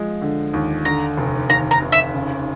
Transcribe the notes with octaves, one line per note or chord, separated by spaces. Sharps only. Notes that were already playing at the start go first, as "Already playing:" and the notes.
Already playing: F3 G#3
D3
D#2
D3 A#5
F1
D#2 A#5
A#5
F1
E5
C#3